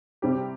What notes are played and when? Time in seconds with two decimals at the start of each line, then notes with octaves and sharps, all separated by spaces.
0.22 C3 G3 C4 G4